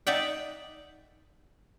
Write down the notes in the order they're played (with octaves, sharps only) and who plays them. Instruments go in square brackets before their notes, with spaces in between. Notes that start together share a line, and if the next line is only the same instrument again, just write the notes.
[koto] D#4 D5 E5 F#5 G5